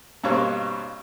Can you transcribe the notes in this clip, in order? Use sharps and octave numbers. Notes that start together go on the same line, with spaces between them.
G2 B2 G3 A#3 C4 C#5